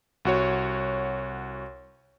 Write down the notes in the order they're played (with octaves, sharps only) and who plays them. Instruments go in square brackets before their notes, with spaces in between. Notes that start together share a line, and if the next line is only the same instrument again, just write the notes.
[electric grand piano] C2 F#4 C#5